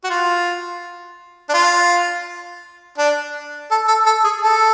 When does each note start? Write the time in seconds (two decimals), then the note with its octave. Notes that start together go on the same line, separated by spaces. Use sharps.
0.04 F#4
0.10 F4
1.49 D4
1.54 F4
2.98 D4
3.71 A4
3.88 A4
4.06 A4
4.24 G#4
4.42 A4